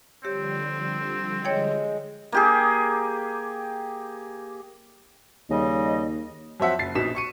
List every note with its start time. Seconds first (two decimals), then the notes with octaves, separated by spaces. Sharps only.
0.23 D3 F3 G3 C4 G4 C#5
1.44 G#3 C#5 G5 G#6
2.32 A#3 G4 G#4
5.50 D#2 C#3 G3 D#5
6.60 F2 F#3 C4 E5 F#5
6.79 F#1 A6 C7
6.95 A#1 B2 D#4 B6 E7
7.15 C#6 C#7 D#7